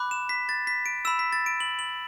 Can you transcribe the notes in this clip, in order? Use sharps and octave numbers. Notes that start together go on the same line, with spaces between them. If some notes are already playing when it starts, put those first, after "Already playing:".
Already playing: B5 D6 F#6
E7
B6
A6
B6
D7
B5 E6 E7
B6
A6
D7
F#7
F#7